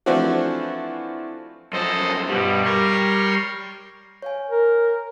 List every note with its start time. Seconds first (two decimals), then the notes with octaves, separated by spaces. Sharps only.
0.06 E3 F3 A3 C4 D4 F#4
1.73 F#2 F3 A4 C5 D#5
2.29 G2 B2 G3
2.65 A#4 C#5 C6
4.22 C#5 F5 G#5
4.50 A#4